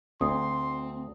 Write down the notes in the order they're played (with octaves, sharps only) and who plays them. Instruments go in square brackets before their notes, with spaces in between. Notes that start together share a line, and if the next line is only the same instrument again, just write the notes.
[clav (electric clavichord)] D2 [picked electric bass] C4 [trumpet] C6 [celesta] D#6